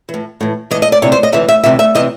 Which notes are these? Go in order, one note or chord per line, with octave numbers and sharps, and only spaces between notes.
E3
A2
A2 E3
A2 E3 D#5
D#5
D5
D2 C3 E3 C#5
C5
D#5
D2 C3 E3 E5
E5
D2 C3 E3 E5
E5
C3 E3 D#5